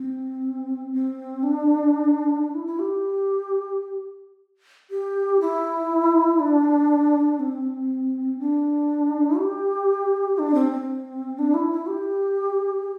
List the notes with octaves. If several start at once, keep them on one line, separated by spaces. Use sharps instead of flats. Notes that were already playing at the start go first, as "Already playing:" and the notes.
Already playing: C4
C4
D4
D4
E4
E4
G4
G4
E4
D4
C4
D4
G4
D4
C4
C4
D4
E4
E4
G4